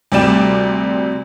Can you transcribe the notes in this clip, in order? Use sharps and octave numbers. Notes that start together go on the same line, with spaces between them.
D2 C3 G3 D5 E7